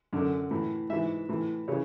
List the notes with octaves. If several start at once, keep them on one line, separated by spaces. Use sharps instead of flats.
F#2 D3
A2 E3
G#2 E3 E5
A2 E3
C#3 E3 C#5